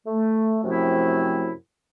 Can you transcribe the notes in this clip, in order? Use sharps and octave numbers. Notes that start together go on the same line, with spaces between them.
A3
F#2 C3 F3 A3 C4 E4